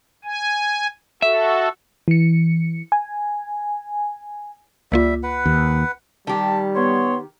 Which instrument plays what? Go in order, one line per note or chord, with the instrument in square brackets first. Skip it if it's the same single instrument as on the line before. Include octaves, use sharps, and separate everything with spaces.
[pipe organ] G#5
[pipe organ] F#4 A4 [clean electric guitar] E5
[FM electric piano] E3 C#7
G#5
[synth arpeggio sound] C#2 A#3 F4 [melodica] G3 E5
[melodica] B4 F#5
[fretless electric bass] D#2
[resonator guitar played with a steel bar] D#3 G4 [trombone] G3 [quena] A5
[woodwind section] B3 C#5 [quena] C6